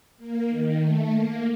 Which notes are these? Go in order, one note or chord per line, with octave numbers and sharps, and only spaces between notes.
A#3
D#3
A3
A#3